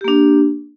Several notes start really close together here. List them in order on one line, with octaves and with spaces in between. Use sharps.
G4 A#3 D4